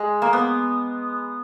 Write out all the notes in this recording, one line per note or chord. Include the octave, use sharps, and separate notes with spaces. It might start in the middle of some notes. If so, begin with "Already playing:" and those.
Already playing: G#3
A#3
B3